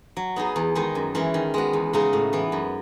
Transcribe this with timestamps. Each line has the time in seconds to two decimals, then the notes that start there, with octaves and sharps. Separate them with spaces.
0.17 F#3
0.36 B3 D#4 G#4
0.56 E2
0.75 D#3 G#3 D#4
0.95 F#2
1.15 E3 G#3 C#4
1.34 D#3
1.54 G#3 B3 F#4
1.73 E2
1.93 C#3 G#3 D#4 F#4
2.13 A2
2.33 E3 B3
2.52 F#2